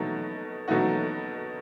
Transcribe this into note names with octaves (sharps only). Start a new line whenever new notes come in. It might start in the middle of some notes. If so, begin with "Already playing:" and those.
Already playing: B2 F#3 A3 D#4 F#4
B2 F#3 A3 D#4 F#4